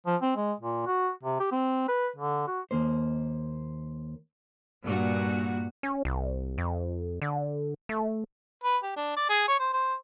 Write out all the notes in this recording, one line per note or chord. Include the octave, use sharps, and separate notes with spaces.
F3
C4
G#3
A#2
F#4
C3
G4
C4
B4
D3
F#4
D#2 A#3 C5
G2 A#2 F#4
C#4
C2
F2
D3
A3
B4
G4
D4
D5
G#4
C#5
C5
C5